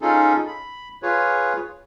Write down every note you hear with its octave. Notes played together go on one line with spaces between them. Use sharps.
C#4 D#4 F4 G#4 A4
B5
F4 G#4 B4 C#5